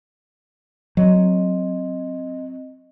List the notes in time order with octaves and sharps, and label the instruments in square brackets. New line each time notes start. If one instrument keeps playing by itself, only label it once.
[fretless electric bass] F#3 [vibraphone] C4 D#5